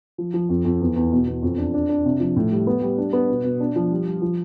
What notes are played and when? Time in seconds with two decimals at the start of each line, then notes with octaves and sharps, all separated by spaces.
0.18 F3
0.34 F3
0.49 F2
0.65 F2
0.81 E2
0.96 E2
1.12 B2
1.27 E2
1.42 F2
1.58 D4
1.74 D4
1.89 D4
2.05 C3
2.20 F3
2.36 A2
2.51 G3
2.67 B3
2.82 G3
2.98 D4
3.13 B3
3.29 B2
3.44 B2
3.60 D4
3.76 F3
3.91 G3
4.06 G3
4.22 F3